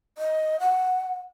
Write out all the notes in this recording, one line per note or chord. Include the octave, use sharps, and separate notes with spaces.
D#5
F#5